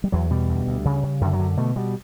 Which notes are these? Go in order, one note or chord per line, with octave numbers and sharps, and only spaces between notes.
G3
E2 F#3
B2 G3
D2
D2
C#3
C#3
F#2 D3
F#3
D3
B2 A3
B2 G3